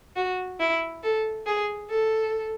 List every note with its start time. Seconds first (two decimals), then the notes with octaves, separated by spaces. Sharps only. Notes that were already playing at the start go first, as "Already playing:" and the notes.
0.16 F#4
0.60 E4
1.03 A4
1.46 G#4
1.90 A4